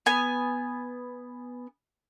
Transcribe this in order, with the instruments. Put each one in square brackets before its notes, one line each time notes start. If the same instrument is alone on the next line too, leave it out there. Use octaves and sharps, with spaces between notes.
[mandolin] B3 G#5